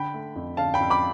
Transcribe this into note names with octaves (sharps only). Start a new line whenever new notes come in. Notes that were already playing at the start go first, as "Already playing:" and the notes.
Already playing: D3 G5 B5
A3
F2
D3 F5 A5
G5 B5
F2
B5 D6